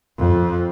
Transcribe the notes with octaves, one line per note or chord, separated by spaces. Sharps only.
F2